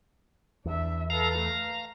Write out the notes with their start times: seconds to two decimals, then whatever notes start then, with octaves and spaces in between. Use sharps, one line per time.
0.65 E2 D4 E5
1.10 A4 B4 F5 A#5
1.39 A3